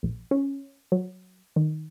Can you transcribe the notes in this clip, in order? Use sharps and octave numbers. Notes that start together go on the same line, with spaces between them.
A#1
C#4
F#3
D#3